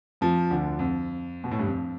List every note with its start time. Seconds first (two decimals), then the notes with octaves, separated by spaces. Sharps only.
0.21 F2 F3
0.51 D2 D3
0.79 F2
1.44 B2
1.51 A2
1.59 G2
1.67 F2